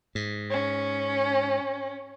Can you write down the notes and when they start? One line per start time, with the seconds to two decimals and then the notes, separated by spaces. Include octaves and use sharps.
0.15 G#2
0.50 C#4